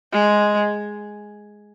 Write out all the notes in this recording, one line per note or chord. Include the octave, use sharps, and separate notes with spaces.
G#3